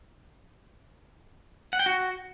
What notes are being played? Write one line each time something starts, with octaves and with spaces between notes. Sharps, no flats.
F#5
G5
F#4